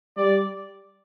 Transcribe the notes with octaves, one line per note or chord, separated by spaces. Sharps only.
G3 D5